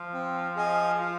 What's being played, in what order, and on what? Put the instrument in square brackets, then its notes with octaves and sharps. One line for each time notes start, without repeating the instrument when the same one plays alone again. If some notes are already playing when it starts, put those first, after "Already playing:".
Already playing: [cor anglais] F3
[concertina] C4
G#4 D#5 G#5
F4